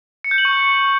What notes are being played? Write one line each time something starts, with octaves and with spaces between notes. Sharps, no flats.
C#7
G6
F#7
C#6